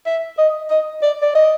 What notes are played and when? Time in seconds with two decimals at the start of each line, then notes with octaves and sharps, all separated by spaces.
0.06 E5
0.38 D#5
0.70 D#5
1.03 D5
1.22 D5
1.35 D#5